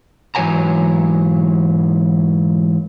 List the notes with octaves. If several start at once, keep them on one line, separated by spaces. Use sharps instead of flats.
G#2 E3 F#3 C#5 G#5 A#5